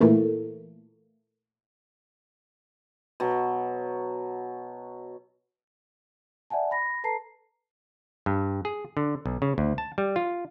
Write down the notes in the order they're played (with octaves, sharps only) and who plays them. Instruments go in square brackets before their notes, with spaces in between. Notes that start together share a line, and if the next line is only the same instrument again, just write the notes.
[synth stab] A#2 E3 A3 A#3
[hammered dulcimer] B2 F#3
[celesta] D5 E5 F#5 G#5 A5
B5 A#6
A4 B4 A5 A#5 C7
[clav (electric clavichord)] G2
G#4
D3
B1
C#3
D2
A5
G3
F4